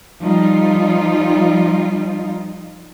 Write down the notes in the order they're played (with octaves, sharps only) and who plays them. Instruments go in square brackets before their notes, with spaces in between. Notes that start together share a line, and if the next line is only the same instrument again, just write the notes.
[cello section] F3 G3 D#4 F4